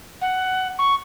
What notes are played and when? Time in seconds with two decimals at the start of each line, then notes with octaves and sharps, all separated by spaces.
0.21 F#5
0.78 C#6